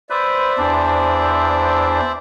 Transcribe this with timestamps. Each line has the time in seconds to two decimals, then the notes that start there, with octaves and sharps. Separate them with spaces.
0.10 B4 C5 D5 E5
0.58 E2 D4